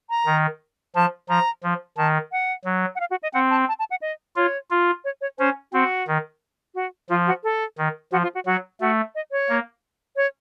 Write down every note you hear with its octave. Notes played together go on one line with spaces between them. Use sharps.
A#5
D#3
F3 A5
F3 A#5
F3
D#3 A5
F#5
F#3
F#5
F5
F#4
D#5
C4 F#5
A5
A5
A5
F#5
D#5
F4 C#5
F4
C#5
C#5
C#4 C5
C4 F#4
D#3
F#4
F3 F4
F#4
A4
D#3
F3 F#4
F4
F#4
F#3 F#4
A3 F#4
D#5
C#5
A#3
C#5